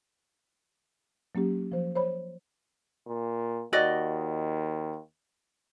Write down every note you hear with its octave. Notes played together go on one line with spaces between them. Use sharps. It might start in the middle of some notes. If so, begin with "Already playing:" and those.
F#3 A#3 C#4 G4
F3 C5
C5 C#5 B5
A#2
D#2 F#4 D5 D#5